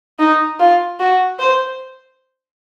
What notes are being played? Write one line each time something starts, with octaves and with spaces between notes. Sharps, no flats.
D#4
F4
F#4
C5